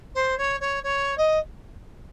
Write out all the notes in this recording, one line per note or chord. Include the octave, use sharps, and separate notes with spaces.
C5
C#5
C#5
C#5
D#5